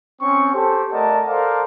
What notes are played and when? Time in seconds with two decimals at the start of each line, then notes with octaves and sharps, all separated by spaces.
0.21 C4 C#4 C#6
0.53 G4 A4 C5
0.91 A3 A#4 D5 D#5 F#5 A5
1.27 A4 A#4 C5 D5 F5